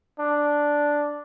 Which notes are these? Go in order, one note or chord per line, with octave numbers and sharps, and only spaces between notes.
D4